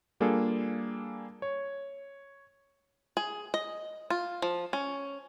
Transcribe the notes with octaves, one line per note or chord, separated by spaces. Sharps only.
G3 A#3 D4 F4 G#4 A4
C#5
G#4
D#5
F4
F3
C#4